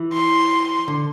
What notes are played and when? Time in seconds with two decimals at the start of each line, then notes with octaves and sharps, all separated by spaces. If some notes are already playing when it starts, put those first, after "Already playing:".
Already playing: E3
0.13 C6
0.88 D3